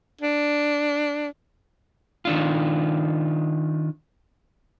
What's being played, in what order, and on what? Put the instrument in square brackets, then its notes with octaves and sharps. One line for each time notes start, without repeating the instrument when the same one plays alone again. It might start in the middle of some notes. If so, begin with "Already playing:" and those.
[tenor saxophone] D4
[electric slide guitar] D#3 D4 F4